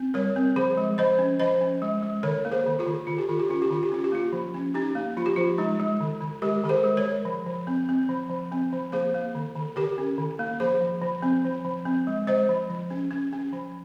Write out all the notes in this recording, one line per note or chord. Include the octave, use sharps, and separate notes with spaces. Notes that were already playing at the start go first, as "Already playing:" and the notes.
Already playing: C4
G3 A#4 C#5
C4
F3 G#4 C5
G#3
F3 C5 D#5
C#4
F3 C5 D#5
C#4
G#3
G#3
D#3 A#4 C#5
A#3
G#4 C5
D#3
F4 G#4
D#3
D#3 F4
G4
D#3 F4
G4
C#4 F4
G4
D#3 F4
G4
C#4 F4
G4
A#3 F4
F3
C#4
C#4 D#4 G4
A#3
F3 F4
G4
F3 F4
G#3 D#4
G#3
D#3
D#3
G#3 G4 A#4
D#3 A#4
G#4 C5
G#3
A#4 C#5
G#3
F3
F3
C4
C4
F3
F3
C4
F3
A#3 G#4 C5
A#3
D#3
D#3
D#3 G4 A#4
C#4
D#3
A#3
F3 G#4 C5
F3
F3
C4
F3
F3
C4
G#3
G#3 C5 D#5
F3
F3
C#4
C#4
C#4
F3